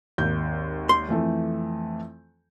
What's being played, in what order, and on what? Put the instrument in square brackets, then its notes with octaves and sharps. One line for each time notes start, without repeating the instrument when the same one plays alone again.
[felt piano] G#1 D#2 G6
[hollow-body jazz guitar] C6
[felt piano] F2 E3 A3